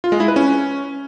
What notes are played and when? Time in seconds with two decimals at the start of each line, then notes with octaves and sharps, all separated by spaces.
0.04 F4
0.12 G#3
0.20 E4
0.28 B4
0.36 C#4